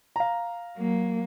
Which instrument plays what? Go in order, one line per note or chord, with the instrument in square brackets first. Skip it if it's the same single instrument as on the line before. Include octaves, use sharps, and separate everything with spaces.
[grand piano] F5 A#5
[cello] F#3 A#3